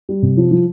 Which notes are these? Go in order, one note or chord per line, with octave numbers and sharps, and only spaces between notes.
G3
C3
F3
F3